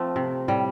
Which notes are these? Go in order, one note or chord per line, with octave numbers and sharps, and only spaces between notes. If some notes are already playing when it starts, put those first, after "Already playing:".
Already playing: F3 A3 C4
C3
A2 G3